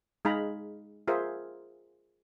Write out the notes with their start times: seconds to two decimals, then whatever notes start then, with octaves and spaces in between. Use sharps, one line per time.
0.25 G#3 D#4 G#4 F5 A#5 B5
1.08 F4 G#4 A#4 C5 E5